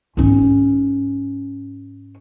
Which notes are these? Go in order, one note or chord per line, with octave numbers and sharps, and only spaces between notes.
G#2 C#4